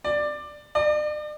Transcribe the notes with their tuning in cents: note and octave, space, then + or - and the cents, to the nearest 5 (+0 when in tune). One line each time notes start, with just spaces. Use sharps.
D5 +15
D5 +40